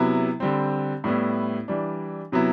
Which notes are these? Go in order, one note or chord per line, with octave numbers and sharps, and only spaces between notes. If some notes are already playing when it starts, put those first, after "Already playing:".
Already playing: C3 F#3 B3 E4
D3 G3 C4
A2 G3 B3 E4
E3 G3 D4
C3 F#3 B3 E4